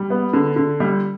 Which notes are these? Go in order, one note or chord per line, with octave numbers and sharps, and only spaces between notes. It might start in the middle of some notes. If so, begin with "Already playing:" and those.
Already playing: G3
B3
D3
D3
G3